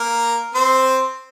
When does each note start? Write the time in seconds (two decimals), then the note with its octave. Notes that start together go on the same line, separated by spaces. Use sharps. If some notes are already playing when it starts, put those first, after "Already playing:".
Already playing: A#3 A#4
0.54 C4 C5